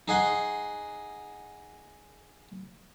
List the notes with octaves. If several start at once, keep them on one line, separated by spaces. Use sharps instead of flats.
D#4 G#4 F#5 C6